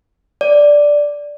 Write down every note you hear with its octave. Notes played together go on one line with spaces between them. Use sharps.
D5